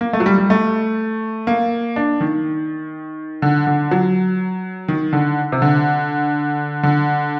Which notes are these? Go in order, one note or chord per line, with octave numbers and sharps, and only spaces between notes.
A#3
A3
F#3
G3
G3
A3
A#3
D4
D#3
D3
D3
F#3
D#3
D3
C3
D3
D3